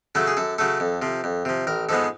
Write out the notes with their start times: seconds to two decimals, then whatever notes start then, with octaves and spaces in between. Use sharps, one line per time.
0.15 C#3 F#3 A3 A4
0.27 G#4
0.37 F#2 A4
0.58 C#3 F#3 A3 A4
0.80 F2
1.02 C3 F3
1.24 F2
1.45 C3 F3
1.67 A1 A#4
1.89 G#2 F3 G#3 B3 A4